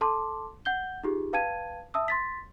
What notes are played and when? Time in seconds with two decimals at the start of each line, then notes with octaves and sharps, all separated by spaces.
0.01 A4 A5 C6 D6
0.65 F#5 G6 G7
1.03 D#4 F4 G4 G#4
1.33 B4 F5 G5 A5 G#6 D#7
1.94 E5 A5 D#6 E6
2.08 C6 A6 B6